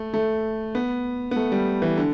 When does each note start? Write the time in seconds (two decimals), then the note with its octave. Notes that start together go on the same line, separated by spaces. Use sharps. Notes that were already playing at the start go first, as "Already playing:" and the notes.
Already playing: A3
0.14 A3
0.75 B3
1.31 B3
1.36 A3
1.52 G3
1.82 E3
1.98 D3